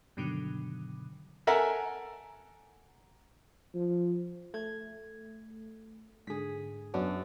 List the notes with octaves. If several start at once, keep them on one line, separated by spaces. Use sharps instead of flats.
G2 B2 D3 D#3 F#3
A4 A#4 E5 F#5 G#5 A#5
F3
A3 G#6
G#2 D3 G#4 B6
F#2 B3 D4 F#4